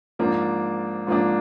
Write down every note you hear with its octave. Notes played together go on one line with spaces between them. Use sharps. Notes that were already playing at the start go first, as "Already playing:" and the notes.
G#2 F3 A#3 D4
G#2 F3 A#3 D4